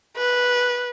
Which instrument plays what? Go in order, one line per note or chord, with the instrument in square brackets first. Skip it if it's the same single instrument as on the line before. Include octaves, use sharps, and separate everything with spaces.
[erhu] B4